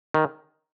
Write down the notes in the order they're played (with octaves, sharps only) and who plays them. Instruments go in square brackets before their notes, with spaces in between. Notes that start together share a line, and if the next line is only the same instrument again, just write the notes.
[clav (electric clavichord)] D#3